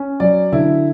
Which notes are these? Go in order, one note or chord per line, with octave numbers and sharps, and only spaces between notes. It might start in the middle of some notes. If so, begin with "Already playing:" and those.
Already playing: C#4
F#3 D5
D3 E4